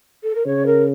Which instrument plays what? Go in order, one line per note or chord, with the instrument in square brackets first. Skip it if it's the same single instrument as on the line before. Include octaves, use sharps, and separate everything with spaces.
[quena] A4
A#4
[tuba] C#3 [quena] C#5
[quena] A#4